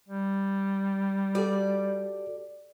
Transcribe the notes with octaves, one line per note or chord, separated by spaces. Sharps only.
G3
F#4 G4 A4 D5